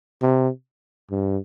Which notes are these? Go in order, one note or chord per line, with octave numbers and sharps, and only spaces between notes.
C3
G2